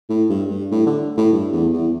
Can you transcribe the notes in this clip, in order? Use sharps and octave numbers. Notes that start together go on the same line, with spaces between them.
A2
G2
G2
A2
D3
A2
G2
E2
E2